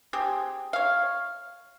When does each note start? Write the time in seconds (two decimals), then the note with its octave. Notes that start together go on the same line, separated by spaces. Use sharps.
0.13 C4 G4 G#4
0.73 C#5 F5